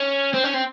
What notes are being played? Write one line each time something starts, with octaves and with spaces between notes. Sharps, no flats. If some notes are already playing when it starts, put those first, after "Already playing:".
Already playing: C#4
C4
C#4
C4